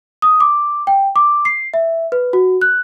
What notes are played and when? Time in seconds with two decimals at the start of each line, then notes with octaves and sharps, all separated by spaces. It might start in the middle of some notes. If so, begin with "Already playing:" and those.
0.22 D#6
0.40 D6
0.87 G5
1.16 D6
1.45 C7
1.74 E5
2.12 B4
2.33 F#4
2.61 F#6